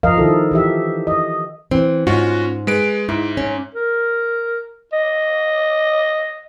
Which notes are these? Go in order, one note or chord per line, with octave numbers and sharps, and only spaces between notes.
F3 A#4 D#5 F5
D#3 E4 A4
E3 G4 E5
D#5
E3 C4
G#2 C#4 F4 F#4
G#3 B4 D7
G#2 E4
C#4
A#4
D#5